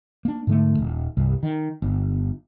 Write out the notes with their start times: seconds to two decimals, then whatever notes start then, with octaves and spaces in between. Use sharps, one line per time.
0.25 A#3 D4
0.47 G#2 D3 A3
0.79 D#1
1.17 C2 G2
1.43 D#3
1.82 G1